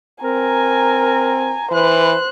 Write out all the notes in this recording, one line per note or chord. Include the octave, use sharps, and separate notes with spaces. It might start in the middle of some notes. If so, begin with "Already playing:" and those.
C4 A#4 G#5 A#5
E3 B4 C5 F#6